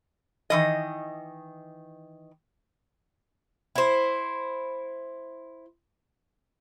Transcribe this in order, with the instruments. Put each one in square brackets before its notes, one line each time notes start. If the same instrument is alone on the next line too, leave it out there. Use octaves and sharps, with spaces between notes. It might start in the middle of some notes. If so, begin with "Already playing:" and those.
[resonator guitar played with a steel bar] D#3 E3 D#5
[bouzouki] E4 C5